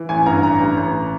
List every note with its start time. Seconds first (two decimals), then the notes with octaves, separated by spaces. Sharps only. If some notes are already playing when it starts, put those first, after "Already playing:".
Already playing: E3
0.09 A1 G#5
0.26 G2 A#5
0.43 A1 A#5
0.60 A1
0.77 A1